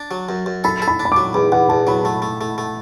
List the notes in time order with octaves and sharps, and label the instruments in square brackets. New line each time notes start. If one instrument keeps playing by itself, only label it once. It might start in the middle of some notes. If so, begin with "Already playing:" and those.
Already playing: [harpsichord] D4
F#3
F#2
F#2
[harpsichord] A4 [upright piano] B5
[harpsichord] A4
[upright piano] B5
[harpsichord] D4
[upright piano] B5
[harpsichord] F#3 [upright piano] D6
[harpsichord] E2 [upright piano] B5
[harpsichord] E2 [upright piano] F#5
[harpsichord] E2 [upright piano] A5
[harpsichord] F#3 [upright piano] B5
[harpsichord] A3
A3
A3
A3